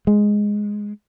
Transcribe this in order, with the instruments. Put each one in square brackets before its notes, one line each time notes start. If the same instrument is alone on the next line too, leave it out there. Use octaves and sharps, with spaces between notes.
[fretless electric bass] G#3